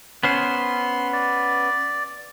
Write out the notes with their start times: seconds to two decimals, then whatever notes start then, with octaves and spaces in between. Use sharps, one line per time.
0.23 B3 C#4 C5 C6
1.13 D5